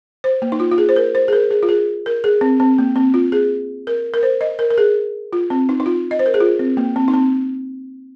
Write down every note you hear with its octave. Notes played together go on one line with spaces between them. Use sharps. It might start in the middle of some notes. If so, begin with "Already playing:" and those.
C5
A#3
D#4
F4
F4
G#4
C5
A#4
C5
G#4
A#4
G#4
F4
G#4
A#4
G#4
C4
C4
A#3
C4
F4
G#4
A#4
A#4
C5
D#5
A#4
A#4
G#4
F4
C4
D#4
D#4
F4
D#5
C5
A#4
G#4
F4
C4
A#3
C4
D#4
C4